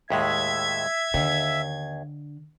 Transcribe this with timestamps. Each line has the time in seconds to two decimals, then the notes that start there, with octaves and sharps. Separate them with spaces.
0.10 D#2 A2 G#3 E5 G#6
1.14 D#2 D3